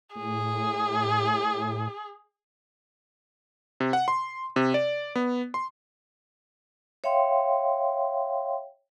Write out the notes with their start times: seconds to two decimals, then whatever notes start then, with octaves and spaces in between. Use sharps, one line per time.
0.16 A2 G#4
3.80 C3
3.93 F#5
4.08 C6
4.56 C3
4.74 D5
5.15 B3
5.54 C6
7.04 C#5 E5 F5 G5 C6